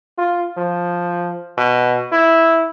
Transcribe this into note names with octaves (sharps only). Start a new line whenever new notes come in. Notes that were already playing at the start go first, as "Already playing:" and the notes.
F4
F3
B2
E4